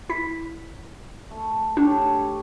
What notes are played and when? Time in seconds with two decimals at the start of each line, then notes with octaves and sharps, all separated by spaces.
0.09 E4 B6
1.30 A3
1.77 D4 G4 A4 C#5